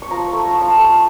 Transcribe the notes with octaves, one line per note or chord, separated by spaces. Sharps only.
C#6
F3 A#5
C#6
A3
A#5
F3
A5
A3 G5